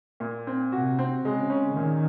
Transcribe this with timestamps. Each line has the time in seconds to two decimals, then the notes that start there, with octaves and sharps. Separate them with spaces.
0.20 A#2
0.47 C4
0.72 C3 F#4
0.99 C4
1.25 C#3 G#3
1.50 C#4
1.76 A#2 D#3